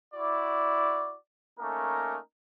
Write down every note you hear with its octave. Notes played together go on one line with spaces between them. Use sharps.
E4 F#4 D5
A3 A#3 C#4 D#4 A#4